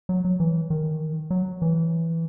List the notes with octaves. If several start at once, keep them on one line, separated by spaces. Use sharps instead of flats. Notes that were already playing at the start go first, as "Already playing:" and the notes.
F#3
F#3
E3
D#3
F#3
E3